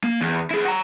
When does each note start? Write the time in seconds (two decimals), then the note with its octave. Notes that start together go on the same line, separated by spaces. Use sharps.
0.03 A#3
0.21 E2
0.51 E4 G#4
0.64 F#5 A#5